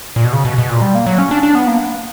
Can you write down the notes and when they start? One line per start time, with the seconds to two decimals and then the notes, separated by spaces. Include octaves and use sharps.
0.16 A#2
0.25 B2
0.33 C#3
0.45 B2
0.58 B2
0.70 A#2
0.82 G3
0.95 A#3
1.07 F#3
1.18 C#4
1.31 D4
1.43 D4
1.55 B3
1.67 A#3